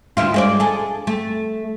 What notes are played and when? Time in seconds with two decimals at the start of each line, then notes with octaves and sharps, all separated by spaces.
0.17 D2 E4 F4
0.34 G#3 C5 D5
0.60 G#4 A4
1.07 A3